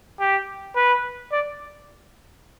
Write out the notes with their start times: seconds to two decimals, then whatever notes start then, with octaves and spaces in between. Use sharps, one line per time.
0.20 G4
0.76 B4
1.32 D5